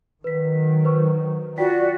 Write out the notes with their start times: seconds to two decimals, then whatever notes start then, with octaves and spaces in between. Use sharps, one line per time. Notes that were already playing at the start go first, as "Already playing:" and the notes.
0.24 D#3 F#3 B4 B6
0.85 B4 C5 C#6
1.58 F4 F#4 D5 G5 B6